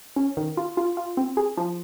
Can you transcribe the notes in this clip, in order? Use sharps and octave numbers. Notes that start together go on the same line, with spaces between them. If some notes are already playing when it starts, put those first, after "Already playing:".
C#4
D#3
F4
F4
F4
C4
G#4
F3